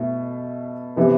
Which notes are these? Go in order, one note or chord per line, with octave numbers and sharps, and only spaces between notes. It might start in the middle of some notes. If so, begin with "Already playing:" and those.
Already playing: B2 A3 E4
C3 E3 B3